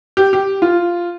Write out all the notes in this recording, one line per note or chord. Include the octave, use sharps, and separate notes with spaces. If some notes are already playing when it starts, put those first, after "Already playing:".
G4
G4
F4